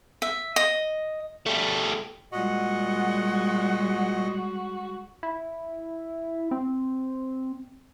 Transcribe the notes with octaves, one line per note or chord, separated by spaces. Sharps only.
E5
D#5
G3 A3
A#2 G3 G#3 F#4 D#5 F#5
E4
C4